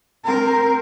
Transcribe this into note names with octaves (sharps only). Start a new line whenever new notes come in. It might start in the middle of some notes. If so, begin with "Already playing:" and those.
C4 A#4